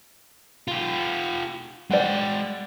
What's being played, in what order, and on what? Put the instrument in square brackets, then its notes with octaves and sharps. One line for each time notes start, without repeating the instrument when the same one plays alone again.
[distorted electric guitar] F4 G4
[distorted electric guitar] G#3 G5 [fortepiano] D5 F#5